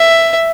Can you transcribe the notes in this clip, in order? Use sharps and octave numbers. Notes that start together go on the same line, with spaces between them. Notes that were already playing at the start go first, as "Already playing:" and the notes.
Already playing: E5